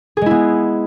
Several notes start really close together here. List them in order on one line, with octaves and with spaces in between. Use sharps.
G#4 G#3 E4 B3